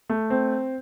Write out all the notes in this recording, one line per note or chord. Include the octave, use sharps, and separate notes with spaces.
A3
C4